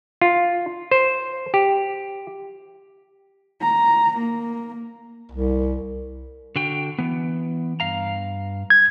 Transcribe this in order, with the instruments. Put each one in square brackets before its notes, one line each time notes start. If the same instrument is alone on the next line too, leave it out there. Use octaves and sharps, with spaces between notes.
[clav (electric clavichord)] F4
C5
G4
[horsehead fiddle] A#5
A#3
[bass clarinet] C2
[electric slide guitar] D3 F#4 G5
E3 B3
G2 F5 A#5
[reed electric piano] G#6